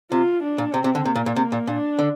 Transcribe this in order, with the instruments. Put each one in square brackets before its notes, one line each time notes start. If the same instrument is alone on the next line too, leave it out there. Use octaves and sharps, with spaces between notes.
[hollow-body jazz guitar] C3 [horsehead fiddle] F4
[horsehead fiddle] D4
[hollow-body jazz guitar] A#2
[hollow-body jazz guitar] C3 [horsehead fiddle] C4
[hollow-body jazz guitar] C3
D3
[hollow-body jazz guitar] C3 [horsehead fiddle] A#3
[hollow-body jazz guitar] A#2
A#2
C3
A#2
[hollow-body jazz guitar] A#2 [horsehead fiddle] D4
[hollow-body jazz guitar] D3